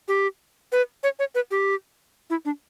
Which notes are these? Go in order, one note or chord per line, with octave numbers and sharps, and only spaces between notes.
G4
B4
C#5
C#5
B4
G4
E4
D4